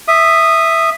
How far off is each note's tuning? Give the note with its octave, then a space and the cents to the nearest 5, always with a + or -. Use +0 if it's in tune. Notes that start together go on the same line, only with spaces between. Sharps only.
E5 +0 D#6 -10